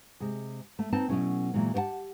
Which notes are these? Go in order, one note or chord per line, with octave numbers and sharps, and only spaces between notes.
C3 G#3 G#4
A3
C4 D#4 B4 A5
B2 E3 F#3 A3 C#4 E4
A#2 E3 F#3 G#3
B3 G4 C#5 F#5 A5